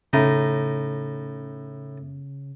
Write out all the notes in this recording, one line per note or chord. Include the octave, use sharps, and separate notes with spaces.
A2 C#3 D#4